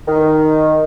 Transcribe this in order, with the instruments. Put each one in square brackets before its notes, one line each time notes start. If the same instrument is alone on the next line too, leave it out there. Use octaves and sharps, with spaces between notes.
[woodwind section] D#3